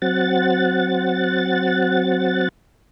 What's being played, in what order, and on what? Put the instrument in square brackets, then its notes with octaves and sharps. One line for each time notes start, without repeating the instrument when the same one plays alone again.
[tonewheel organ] F#3 C4 F#5 A6